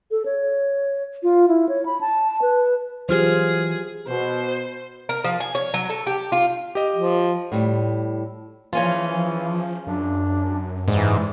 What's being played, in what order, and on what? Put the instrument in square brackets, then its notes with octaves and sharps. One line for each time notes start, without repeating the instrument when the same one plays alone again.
[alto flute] A4
C#5
F4
E4
C#5
B5
A5
B4
[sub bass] E3 [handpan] F#3 F4 G4 [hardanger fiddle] G#4 [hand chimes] C5 F6
[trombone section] B2 [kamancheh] C5
[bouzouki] A#4
F3
G#5
C#5
F#3
A4
G4
F4
[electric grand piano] G4 D#5
[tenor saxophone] F3
[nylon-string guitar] A2 G3
[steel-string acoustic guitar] C#3 C#4 F4 [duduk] E3 [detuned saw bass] F3
[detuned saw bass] F#2 [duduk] D4
[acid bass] G#2 [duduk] E3 [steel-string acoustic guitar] G3